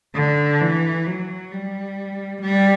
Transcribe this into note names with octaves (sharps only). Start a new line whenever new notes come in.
D3
E3
F#3
G3
G3